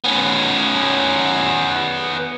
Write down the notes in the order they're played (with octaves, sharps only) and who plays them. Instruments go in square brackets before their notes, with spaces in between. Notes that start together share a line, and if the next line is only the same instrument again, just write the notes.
[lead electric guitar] B3 C#4